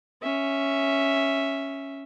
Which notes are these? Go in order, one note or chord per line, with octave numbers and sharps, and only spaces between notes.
C#4 E5